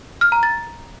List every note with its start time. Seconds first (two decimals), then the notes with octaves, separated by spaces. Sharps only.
0.21 F6
0.32 A#5
0.43 A6